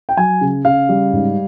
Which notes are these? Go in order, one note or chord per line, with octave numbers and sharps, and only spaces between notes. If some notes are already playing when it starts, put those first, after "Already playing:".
G5
F#3 G#5
C#3
C#3 F5
G3
G#2